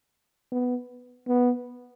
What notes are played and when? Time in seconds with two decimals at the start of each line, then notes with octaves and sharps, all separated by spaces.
0.52 B3
1.28 B3